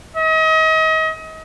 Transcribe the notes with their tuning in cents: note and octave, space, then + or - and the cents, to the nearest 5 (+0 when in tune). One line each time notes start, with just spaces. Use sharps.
D#5 +35